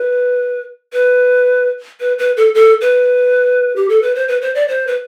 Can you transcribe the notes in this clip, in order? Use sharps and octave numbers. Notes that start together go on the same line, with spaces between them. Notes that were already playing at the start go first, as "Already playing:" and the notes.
Already playing: B4
B4
B4
B4
A4
A4
B4
G4
A4
B4
C5
B4
C5
D5
C5
B4